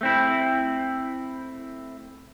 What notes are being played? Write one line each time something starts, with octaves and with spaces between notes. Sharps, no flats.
A3 C4 E4